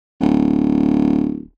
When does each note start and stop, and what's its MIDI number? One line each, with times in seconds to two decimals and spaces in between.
0.21 1.43 26